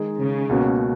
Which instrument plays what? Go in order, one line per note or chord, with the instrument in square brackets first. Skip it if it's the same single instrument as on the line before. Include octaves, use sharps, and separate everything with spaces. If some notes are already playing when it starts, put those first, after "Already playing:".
Already playing: [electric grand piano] D#3 G#3 D#4 G#4
[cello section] C#3
[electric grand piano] C#2 B2 A#3 C#4 F#4